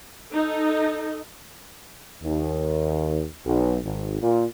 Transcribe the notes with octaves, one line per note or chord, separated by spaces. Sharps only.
D#4 A4
D#2
B1
G#1
A#2